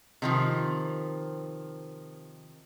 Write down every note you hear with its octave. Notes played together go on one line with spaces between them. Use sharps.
C3 D#3 F3